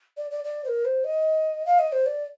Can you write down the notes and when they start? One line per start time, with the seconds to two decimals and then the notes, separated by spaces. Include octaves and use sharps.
0.17 D5
0.31 D5
0.44 D5
0.64 C5
0.68 A#4
0.85 C5
1.04 D#5
1.66 F5
1.79 D#5
1.92 C5
2.06 D5